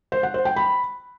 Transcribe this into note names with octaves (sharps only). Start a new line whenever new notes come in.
C5
F#5
C5
G5
B5